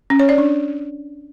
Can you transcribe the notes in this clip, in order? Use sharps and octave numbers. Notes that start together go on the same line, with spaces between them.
C#4
C#5
D5
D4